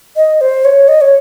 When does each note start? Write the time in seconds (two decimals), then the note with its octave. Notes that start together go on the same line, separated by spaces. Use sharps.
0.16 D#5
0.41 C5
0.65 C#5
0.88 D#5
1.01 C#5